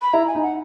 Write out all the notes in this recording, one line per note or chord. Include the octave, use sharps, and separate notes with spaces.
B5
E4 A#5
G#5
D#4
F#5